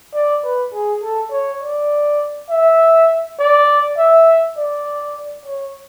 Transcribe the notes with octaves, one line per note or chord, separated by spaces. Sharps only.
D5
B4
G#4
A4
C#5
D5
E5
D5
E5
D5
C#5